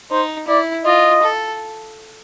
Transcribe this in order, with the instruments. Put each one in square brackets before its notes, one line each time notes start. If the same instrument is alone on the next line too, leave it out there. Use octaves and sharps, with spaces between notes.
[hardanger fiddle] D#4 [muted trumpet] C5
[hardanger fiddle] E4 [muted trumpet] D5
[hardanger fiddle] F4 [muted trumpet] D#5
[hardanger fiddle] A4